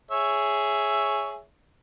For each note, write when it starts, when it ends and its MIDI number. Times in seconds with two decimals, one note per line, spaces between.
0.11 1.42 68
0.11 1.42 73
0.11 1.42 76